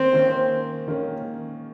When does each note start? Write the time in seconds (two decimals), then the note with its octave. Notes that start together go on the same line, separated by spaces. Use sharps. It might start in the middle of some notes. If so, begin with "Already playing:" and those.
Already playing: D#3 A#3 C4 C#4
0.13 D#3 A#3 C#4
0.88 D#3 A#3 C#4